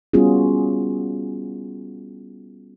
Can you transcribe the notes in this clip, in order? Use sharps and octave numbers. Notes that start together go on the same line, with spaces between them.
G3 B3 C#4 F4 F#4 G#4